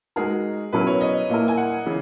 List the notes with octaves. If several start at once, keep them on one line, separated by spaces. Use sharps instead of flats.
G#3 D#4 F#4 G#4 A#4
B2 F#3 C#4 E4 A#4 B4
C#5
D#5
A#2 A#3 E4 A#4
G#5
F#5
C#3 E3